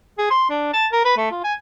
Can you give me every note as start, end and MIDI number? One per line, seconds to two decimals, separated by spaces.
0.18 0.26 68
0.31 0.45 84
0.50 0.69 62
0.74 0.87 81
0.92 1.03 70
1.05 1.14 71
1.17 1.29 57
1.31 1.44 65
1.44 1.54 80